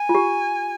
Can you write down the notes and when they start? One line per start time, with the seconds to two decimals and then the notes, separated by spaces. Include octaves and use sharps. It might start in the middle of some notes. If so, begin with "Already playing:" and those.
Already playing: G#5
0.09 F4
0.15 G4